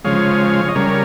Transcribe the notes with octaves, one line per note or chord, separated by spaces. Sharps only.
C#3 F3 G#3 C#5 F5
D#5
C#3 G3 A#4 C#5